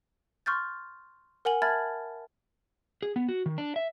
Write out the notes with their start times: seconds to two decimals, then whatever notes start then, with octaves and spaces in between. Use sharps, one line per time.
0.46 C6 C#6 F6 G6 A6
1.45 A#4 F#5 G#5 F#7
1.62 E5 A5 B5 F6 G#6 A6
3.03 G#4
3.16 B3
3.29 F#4
3.46 D#3
3.58 D4
3.76 E5